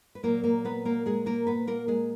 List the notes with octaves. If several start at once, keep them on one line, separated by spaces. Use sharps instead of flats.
B4
A#2 F#3 A#3 A#4
A#3 A#4
B3 B4
A#3 A#4
G#3 G#4
A#3 A#4
B3 B4
A#3 A#4
G#3 G#4